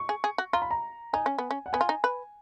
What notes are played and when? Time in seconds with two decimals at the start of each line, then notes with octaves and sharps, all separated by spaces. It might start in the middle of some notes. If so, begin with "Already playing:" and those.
Already playing: C#6
0.09 G#4
0.24 G#4
0.38 F#4
0.53 F4 A#5
0.62 B5
0.71 A#5
1.13 D#4 G#5
1.26 C#4
1.38 B3
1.51 C#4
1.66 F#5
1.73 B3 G#5
1.81 F4
1.89 D#4
2.04 B4